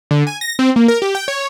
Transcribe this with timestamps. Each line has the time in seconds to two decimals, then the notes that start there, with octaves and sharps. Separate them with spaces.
0.11 D3
0.27 G#5
0.41 A#6
0.59 C4
0.76 A#3
0.88 A#4
1.02 G4
1.15 G5
1.28 C#5